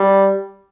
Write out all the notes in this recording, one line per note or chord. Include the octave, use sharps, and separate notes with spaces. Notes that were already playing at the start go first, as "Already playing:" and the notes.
Already playing: G3